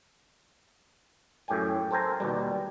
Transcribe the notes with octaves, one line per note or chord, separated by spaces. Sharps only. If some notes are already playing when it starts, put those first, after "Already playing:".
F#2 A2 G4 G5 G#5
A4 A#4 C5 G5 G#5 A#5
D#2 B2 G3